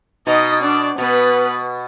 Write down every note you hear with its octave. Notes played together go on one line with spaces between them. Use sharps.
B2 D#4 D#5
D4 D5
B2 B3 B4